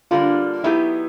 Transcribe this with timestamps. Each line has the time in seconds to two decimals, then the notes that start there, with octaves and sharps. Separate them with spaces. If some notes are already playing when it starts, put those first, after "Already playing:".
0.11 D3 G3 A#3 D4 F4
0.64 F#3 B3 D#4 E4 G4